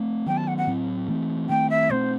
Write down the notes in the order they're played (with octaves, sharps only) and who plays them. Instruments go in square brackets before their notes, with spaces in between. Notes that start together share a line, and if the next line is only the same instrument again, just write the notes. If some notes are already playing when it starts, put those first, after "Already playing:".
Already playing: [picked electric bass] A3 C4
[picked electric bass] D#3 F#3 B3 [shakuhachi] G5
[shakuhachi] A5
F#5
F#5
[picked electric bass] A2 F#3 C4
E3 A3 C4
[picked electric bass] D#3 A3 C4 [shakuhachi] G5
[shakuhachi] E5
[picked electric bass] B2 A3 C4 [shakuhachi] C5